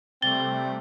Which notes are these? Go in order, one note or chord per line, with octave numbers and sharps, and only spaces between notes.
C3 G3 A3 C4 A6 G7